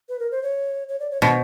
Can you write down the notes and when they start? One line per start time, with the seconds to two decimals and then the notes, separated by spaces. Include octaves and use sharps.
0.09 B4
0.20 A#4
0.32 C5
0.43 C#5
0.89 C#5
1.00 D5
1.11 C#5
1.22 B2 C5